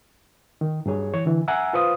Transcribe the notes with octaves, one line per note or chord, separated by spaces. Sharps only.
D#3
G2 F#3 G#4 C#5
E3 C#5
D3 E3
E5 F#5 G#5 A#5 E6
F4 B4 C5 F5 D#6